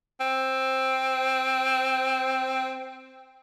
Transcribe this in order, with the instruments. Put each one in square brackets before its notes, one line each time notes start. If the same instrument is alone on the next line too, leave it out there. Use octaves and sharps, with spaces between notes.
[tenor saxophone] C4